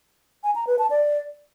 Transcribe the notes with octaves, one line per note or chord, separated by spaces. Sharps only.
G#5
A#5
B4
A5
D5